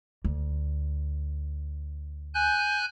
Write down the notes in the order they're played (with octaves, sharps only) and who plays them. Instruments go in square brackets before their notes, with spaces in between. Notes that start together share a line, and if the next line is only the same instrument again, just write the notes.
[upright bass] D2
[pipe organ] G#5 F#6 G6